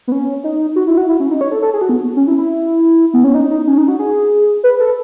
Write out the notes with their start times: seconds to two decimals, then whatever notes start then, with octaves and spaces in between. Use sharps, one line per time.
0.08 B3
0.12 C#4
0.44 D#4
0.76 F#4
0.87 E4
0.97 F#4
1.09 E4
1.20 C#4
1.30 D#4
1.41 C#5
1.51 A4
1.62 A4
1.73 G#4
1.81 F#4
1.89 B3
2.17 C#4
2.27 E4
2.38 E4
3.14 B3
3.24 C#4
3.34 D#4
3.51 D#4
3.67 C#4
3.78 D#4
3.88 F#4
3.99 G#4
4.64 B4
4.80 A4